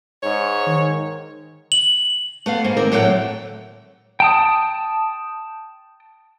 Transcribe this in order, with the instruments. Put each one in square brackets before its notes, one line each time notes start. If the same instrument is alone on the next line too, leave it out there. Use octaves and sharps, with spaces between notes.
[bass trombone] G#2 [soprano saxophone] C#5
[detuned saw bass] D#3
[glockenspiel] F#7
[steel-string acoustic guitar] A3 B3 F5
G#2 A#3
D#3 A#3 C4 A#4
A2 D3 F#3 A3 F#5 G5
[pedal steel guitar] G5 A5 D#6